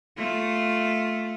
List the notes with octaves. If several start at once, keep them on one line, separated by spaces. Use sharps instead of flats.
A3 F4